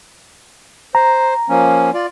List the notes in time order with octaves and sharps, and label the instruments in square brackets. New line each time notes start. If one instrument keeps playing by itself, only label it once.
[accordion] C5 [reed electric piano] A#5
[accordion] F3 A#3 C#4
F4 D5